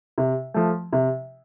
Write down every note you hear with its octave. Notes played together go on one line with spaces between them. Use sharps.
C3
F3 A3
C3